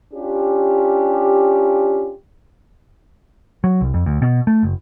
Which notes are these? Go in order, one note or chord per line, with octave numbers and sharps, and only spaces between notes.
C#4 D4 F4 G4
F#3
C2
F2
D2
B2
A3
F#1